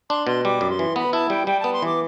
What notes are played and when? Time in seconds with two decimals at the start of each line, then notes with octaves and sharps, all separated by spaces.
0.10 D4 C6
0.27 B2 C6
0.44 G3 D6
0.61 F#2
0.70 C6
0.79 E3
0.96 B3 B5
1.13 E4 A5
1.30 G3 G5
1.47 G3 G5
1.60 B3 A5
1.73 C6
1.82 E3 D6